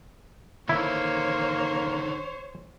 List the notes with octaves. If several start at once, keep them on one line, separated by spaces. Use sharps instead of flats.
D3 D#3 A#3 E4 C5 C#5